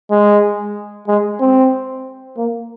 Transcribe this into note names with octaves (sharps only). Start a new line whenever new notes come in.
G#3
G#3
C4
A#3